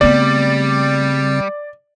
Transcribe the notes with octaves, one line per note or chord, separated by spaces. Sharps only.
C#3 G3 A3 B3 C4 D5 A6